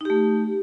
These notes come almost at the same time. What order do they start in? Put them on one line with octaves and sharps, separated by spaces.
D#4 G4 A3